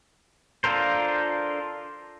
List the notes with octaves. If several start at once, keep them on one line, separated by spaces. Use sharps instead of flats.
D4 F4 A4 A#4 C5